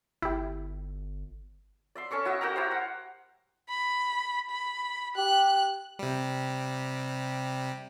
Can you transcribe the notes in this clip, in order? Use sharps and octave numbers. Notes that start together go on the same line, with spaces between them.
G1 E4 G4
D5 E5 C6
C#4 A4 C#6 D6
E4 F#4 D#5 E5
F#4 A#4 G5 A#5
E4 G4 C5
F#5
B5
B5
G4 F#6
C3 G3